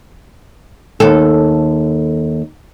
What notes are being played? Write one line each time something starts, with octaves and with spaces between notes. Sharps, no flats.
D#2 A4